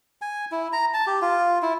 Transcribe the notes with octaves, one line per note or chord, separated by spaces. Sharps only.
G#5
E4
A#5
A5
G4
F4
E4